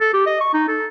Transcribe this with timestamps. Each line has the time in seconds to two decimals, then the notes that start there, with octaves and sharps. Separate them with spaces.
0.01 A4
0.13 G4
0.26 D#5
0.40 C#6
0.53 D#4
0.68 A4